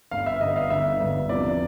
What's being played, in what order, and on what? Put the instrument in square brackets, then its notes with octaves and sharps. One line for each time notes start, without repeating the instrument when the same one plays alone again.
[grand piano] G1 G2 D3 [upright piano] F5
[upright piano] E5
[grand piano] G1 G2 D3 [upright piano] D#5
[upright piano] F5
[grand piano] G1 G2 D3 [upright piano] E5
[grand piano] G1 G2 D3
[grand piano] E2 C3 F3 [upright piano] D5